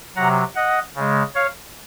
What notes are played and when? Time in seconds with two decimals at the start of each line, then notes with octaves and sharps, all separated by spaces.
0.16 C3 F#3 F#5 A#5
0.55 D#5 F#5
0.95 C#3 G#3
1.35 C#5 F5